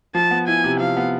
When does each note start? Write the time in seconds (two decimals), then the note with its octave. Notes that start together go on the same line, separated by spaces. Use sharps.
0.14 F3 A5
0.31 B3
0.48 E4 G#5
0.64 C3
0.79 F3 F5
0.97 B3